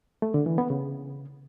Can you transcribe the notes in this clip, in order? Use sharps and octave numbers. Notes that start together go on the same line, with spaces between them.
A3
D3
E3
B3
C#3